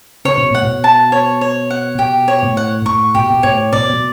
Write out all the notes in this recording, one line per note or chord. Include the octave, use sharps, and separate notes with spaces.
C#3 C#5
B2
A2 F#5
B2
A5
C#5
C#5
F#5
B2 G4
C#5
A2
F#5
A2 C#6
B2 G4
B2
A2 C#5
B2 D5
B2